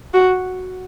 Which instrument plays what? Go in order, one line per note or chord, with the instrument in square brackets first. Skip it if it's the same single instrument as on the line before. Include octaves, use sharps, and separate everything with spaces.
[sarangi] F#4